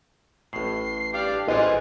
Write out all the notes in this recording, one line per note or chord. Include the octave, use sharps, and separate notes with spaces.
A1 A2 C7
D4 G4 F5
A1 E3 F4 G#4 C5 D#5 F#6